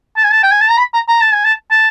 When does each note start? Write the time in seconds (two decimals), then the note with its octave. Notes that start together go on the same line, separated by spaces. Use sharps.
0.17 A5
0.24 G#5
0.32 A5
0.43 G5
0.51 G#5
0.61 A5
0.69 A#5
0.77 B5
0.94 A#5
1.09 A#5
1.21 A5
1.33 G#5
1.45 A5
1.71 A5